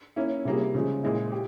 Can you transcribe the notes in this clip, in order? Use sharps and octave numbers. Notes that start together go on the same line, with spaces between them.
A#3 C#4 E4
C3 G3 A#3 F4 G#4
C#3 F3 G#3
A#2 G#3 E4
G4